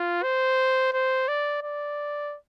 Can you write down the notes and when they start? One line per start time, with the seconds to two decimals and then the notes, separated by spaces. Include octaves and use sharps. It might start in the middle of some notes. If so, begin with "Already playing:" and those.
Already playing: F4
0.23 C5
0.93 C5
1.28 D5
1.63 D5